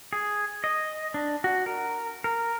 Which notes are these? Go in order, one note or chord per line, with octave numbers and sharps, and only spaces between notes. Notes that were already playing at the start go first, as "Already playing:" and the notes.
G#4
D#5
D4
F#4
A#4
A#4